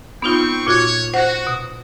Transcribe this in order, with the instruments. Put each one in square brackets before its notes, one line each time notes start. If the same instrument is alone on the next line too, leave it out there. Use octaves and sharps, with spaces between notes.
[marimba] B3 D#4 F4 [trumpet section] C4 G5 C#6
[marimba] A#2 F4 F#4 [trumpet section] C#5
[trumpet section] F#4 [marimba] C5 F#5
[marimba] B2